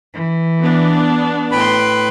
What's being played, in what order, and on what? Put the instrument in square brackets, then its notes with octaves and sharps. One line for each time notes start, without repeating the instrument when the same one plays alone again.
[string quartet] E3
[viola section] B3 D4
[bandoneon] A2 B4 B5 [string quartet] G5 C6